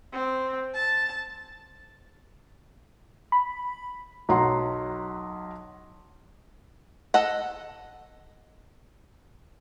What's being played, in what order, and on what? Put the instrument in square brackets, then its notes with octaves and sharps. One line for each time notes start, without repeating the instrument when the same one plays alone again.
[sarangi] C4
A5
[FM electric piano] B5
[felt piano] B1 F#3 F#5 A#5 C6
[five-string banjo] A4 D#5 F#5